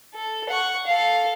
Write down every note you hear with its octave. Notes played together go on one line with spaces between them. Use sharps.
A4
F#5 C#6
A4 F5